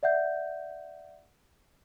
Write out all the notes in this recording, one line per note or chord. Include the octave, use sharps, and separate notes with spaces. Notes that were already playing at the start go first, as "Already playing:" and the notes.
D5 E5 F#5 G6